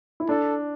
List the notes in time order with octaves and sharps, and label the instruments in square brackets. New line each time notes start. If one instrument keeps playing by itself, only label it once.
[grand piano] E4
[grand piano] D4 [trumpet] A4